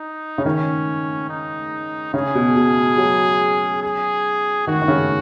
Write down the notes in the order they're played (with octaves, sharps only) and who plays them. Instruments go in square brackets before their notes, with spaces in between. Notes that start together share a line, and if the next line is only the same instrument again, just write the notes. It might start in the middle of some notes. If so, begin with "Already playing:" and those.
Already playing: [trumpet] D#4
[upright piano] C#3
[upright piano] D#3 [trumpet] C#4
[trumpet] D#4
[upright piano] C#3 [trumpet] G#4
[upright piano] B2
B2
F#3
[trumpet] G#4
[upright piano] D#3 [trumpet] F#4
[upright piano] D#3
C#3